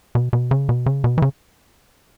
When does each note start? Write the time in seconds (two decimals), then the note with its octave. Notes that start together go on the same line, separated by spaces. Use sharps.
0.15 B2
0.33 B2
0.51 C#3
0.69 B2
0.86 C#3
1.04 B2
1.18 E3
1.22 C#3